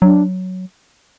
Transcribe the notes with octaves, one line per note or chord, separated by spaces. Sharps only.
F#3 D4